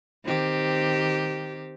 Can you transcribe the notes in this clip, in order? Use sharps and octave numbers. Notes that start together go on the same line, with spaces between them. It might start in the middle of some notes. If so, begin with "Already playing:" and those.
D#3 C4 G4